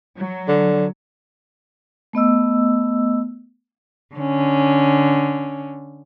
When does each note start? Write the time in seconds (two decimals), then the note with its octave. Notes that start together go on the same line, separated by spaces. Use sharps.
0.17 F#3
0.48 D3
2.13 A3 B3 D#5 E6
4.14 D3 C#4